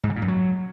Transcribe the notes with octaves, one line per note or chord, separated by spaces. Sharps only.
G#2
C#3
A#2
F#2
F#3